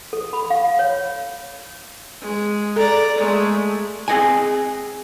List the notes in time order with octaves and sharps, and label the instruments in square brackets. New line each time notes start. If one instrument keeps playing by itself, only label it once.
[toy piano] A4
B5
F5
C#5
[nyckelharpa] G#3
[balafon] A4 [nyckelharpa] D5 A#5
[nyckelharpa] G#3 A3
[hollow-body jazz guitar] C4 G#4 D#5 F#5 G#5